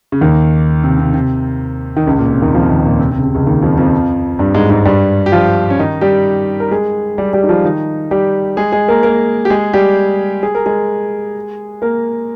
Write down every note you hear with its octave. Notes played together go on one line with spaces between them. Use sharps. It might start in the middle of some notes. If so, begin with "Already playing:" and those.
C#3
D#2 D#3
C3
C3
C3
D#3
C#2 C#3
A#2
C3
D#2 D#3
F2 F3
D#2 D#3
A#2
C3
C3
C#3
C3
C#2 C#3
D#2 D#3
F2 F3
F2 F3
G2 G3
G#2 G#3
G#2 G#3
G2 G3
G4
F3 F4
C#4
D#3 D#4
G3 G4
A#4
G#3 G#4
G3 G4
G3 G4
D#4
F3 F4
D#3 D#4
G3 G4
G#3 G#4
G#3 G#4
A#3 A#4
A#3 A#4
G4
G#3 G#4
G3 G4
G#4
A#4
G#3 G#4
A#3 A#4